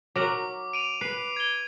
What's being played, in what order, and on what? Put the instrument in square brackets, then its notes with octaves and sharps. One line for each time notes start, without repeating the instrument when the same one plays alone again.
[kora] F#3 A#4 F#5 [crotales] D6
[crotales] D7 D#7 F7
[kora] B4 [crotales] C7
[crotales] G#6 G7